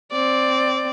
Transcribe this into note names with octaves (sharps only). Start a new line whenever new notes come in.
C4 D5